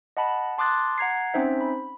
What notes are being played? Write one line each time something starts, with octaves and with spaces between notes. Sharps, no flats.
D#5 F#5 A5 B5
A5 C6 D6 D#6 F#6 A6
F#5 A#5 G#6 C7
C4 C#4 D#4 C5 E5
B5